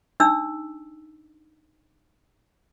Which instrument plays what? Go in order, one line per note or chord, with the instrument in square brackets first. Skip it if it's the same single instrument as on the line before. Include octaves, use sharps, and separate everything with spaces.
[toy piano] D4 D#4 E6